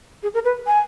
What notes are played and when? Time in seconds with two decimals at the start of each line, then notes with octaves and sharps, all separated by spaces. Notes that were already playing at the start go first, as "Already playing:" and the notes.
0.23 G#4
0.34 A#4
0.45 B4
0.67 G#5